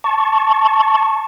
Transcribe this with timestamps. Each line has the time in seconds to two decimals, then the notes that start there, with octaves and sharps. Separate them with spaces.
0.04 A5 C#6